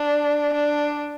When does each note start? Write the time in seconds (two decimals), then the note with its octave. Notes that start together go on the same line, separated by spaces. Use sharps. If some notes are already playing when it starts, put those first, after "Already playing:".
Already playing: D4
0.53 D4